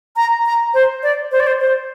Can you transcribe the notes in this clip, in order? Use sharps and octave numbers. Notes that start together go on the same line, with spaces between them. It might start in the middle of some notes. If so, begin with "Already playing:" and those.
A#5
A#5
C5
D5
C5
D5
C5
C5